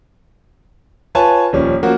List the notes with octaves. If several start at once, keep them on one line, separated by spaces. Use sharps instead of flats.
F4 B4 C#5 G#5 A5
D#1 F3 C#4
F3 A#3 C#4 F#4